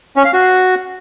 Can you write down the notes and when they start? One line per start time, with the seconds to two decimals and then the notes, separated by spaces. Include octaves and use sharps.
0.16 C#4
0.25 F5
0.33 F#4